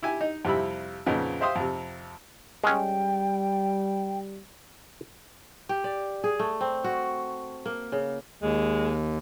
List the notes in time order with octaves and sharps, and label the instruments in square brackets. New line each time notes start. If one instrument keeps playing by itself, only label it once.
[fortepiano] E4 G4 G#5
D#4
F2 C3 G3 E4 B5
F2 A#2 C#3 B3 D#4
C5 E5 F5 G5 C6 D#6
F2 C3
[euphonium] G3 [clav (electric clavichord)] G#3 C#4 [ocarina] G5
[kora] G4
D5
G#4
A3
C4
F#4
A#3
C#3
[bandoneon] D#2 [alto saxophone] G#3